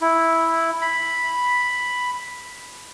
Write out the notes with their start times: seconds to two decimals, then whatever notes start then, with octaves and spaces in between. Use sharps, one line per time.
0.01 E4
0.81 B5